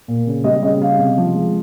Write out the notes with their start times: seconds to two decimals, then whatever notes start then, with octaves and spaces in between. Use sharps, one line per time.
0.08 A#2
0.27 C#3
0.44 G3 D#5
0.63 C#3 D#5
0.81 G3 F5
0.99 C3
1.18 F3
1.35 G#3